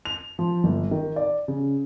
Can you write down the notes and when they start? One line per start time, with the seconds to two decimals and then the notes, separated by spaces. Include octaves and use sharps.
0.05 F7
0.39 F3
0.64 G1
0.91 D#3
1.16 D5
1.48 C#3